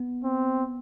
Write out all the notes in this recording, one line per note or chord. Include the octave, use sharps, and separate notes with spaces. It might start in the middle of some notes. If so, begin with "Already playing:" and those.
Already playing: B3
C4